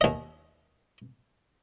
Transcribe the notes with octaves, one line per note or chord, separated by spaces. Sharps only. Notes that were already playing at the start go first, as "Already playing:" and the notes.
D#2 D#5